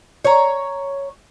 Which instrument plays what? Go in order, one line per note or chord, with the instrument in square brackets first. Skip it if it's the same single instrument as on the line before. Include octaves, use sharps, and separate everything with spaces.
[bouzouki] C#5 A#5